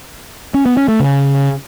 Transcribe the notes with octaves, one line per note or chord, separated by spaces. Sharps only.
C#4
B3
C#4
A3
C#3